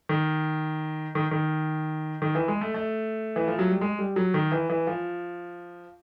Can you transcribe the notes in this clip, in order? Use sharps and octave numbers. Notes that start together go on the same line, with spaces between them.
D#3
D#3
D#3
D#3
E3
G#3
A3
A3
E3
F3
F#3
G3
G#3
G3
F#3
D#3
E3
E3
F3